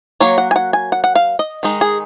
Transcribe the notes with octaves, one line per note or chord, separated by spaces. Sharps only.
F#3 A#3 C#5
F#5
G#5
F#5
G#5
F#5
F#5
F5
D#5
D#3 G#3 D#4
G#4